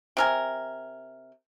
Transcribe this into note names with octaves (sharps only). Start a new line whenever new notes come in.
C3 A#4 G#5